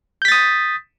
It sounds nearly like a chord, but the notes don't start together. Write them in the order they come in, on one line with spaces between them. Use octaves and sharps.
G6 B6 A6 D#6